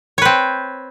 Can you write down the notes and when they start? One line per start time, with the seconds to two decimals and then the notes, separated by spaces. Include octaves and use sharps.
0.18 C#5
0.22 B4
0.25 C4